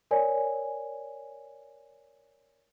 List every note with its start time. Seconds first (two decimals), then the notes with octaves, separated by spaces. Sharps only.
0.11 A#4 C#5 D5 G#5